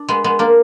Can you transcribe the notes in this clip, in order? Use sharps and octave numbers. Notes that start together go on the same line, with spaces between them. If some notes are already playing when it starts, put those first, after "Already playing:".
Already playing: D4
G#3 B3
G#3 B3
A#3 D4